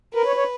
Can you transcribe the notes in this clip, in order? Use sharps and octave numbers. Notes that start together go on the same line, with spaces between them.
A#4 B4
C#5
C#5